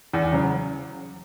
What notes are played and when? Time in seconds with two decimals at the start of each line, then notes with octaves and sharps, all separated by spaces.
0.13 E2
0.33 C#3 F#3